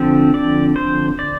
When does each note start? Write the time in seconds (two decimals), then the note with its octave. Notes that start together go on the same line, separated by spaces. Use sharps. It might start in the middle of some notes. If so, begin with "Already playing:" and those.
Already playing: D3 F3 C4
0.34 D5
0.76 C5
1.19 D5